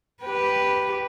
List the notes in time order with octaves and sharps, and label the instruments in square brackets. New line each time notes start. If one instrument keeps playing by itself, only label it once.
[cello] G4 B4